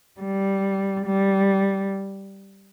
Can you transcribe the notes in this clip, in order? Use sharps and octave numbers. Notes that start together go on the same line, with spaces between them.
G3
G3